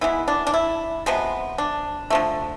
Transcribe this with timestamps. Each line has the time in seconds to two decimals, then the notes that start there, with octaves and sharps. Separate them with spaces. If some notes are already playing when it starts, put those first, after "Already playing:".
0.01 E3 G#3 B3 E4
0.28 D4
0.47 D4
0.54 E4
1.06 C3 F3 G#3 B3
1.58 D4
2.10 D3 F3 A3